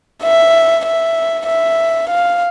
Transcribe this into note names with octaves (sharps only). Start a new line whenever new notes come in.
E5
E5
E5
F5